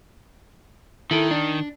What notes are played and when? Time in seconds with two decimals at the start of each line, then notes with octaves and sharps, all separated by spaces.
1.11 D#3 E4 A4
1.31 D4